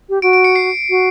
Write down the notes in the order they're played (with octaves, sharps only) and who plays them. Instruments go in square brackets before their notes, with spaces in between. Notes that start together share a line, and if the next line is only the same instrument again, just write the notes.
[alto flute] G4
[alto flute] F#4 [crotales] D7
[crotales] D7
C#7
C7
[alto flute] F#4